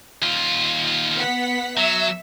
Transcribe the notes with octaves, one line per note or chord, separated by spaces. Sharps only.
D#2 F4
B3 F#5 B6
F#3 E5 E6